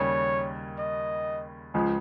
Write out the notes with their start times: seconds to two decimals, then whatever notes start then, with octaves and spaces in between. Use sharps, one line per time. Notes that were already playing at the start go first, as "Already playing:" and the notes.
Already playing: D#2 C#3 G3 C#5
0.78 D#5
1.74 C#2 C#3 F3 G#3